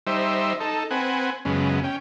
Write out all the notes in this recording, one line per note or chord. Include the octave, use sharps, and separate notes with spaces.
G3 D#4 C5 E5
D#4 A4
C4 B4 F#5 G#5
F#2 C#3 G#3 B3
C#4 G5